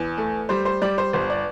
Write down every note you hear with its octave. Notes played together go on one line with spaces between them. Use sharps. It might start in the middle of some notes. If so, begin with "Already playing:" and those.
Already playing: E2
A3
G3 C5
C5
G3 D5
C5
G1 C5
D5